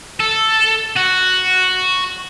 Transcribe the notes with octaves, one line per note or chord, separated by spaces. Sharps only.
A4
F#4